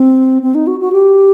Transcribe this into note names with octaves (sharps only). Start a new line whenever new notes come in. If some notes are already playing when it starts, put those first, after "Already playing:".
Already playing: C4
C4
D#4
F#4
F#4
G4